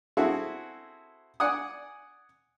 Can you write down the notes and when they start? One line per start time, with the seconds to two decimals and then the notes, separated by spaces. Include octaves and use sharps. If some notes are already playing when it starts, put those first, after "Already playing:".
0.17 C4 E4 F#4 G#4 A4
1.40 D5 F#5 G#5 D#6